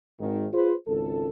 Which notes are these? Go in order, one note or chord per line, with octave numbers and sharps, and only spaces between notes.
G#1 D#3
F4 G#4 B4 C5
G#1 C#2 A4